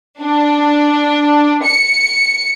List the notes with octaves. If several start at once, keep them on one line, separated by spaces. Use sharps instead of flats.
D4
C#7